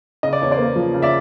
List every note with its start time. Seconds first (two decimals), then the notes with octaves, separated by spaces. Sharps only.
0.23 C#3 D#5
0.33 D5
0.41 E2 C#5
0.51 C5 D5
0.58 A#3
0.76 F3
0.94 C#3
1.02 D5 E5